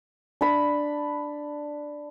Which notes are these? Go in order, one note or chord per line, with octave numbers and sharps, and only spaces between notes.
D4 B5